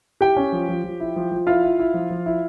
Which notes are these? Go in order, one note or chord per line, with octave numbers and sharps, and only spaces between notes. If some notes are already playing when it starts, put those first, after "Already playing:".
E4 G4 G5
C#4
F3
F3
F3
E4
F3
F3
E4 F4 F5
E4
E4
F3
F3
E4